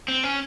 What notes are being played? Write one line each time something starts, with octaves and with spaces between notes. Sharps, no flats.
C4
C#4